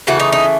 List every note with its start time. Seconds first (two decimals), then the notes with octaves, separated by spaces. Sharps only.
0.07 C#3 E3 A3 F#4
0.20 D#4
0.32 D#4